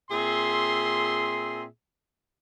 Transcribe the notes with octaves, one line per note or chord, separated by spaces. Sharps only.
A#2 C4 G#4 E5 C6